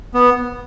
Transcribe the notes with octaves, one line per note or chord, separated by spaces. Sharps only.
B3